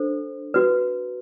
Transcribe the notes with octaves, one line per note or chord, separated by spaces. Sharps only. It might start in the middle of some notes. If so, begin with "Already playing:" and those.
Already playing: D4 A4 C5
F#4 B4